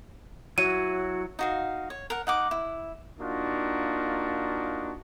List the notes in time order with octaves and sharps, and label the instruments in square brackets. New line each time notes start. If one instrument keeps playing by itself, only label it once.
[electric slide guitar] F#3 E4 C#5 [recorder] F#4 [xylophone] D#7
[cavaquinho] D#4 F#4 F5
C#5
A#4 F#5
D#4 F#5 D6
E4
[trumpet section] A#3 D4 D#4 F4 F#4